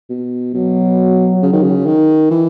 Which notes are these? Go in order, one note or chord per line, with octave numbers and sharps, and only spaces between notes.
B2
B2 F#3
C#3
D#3
C#3
D#3
E3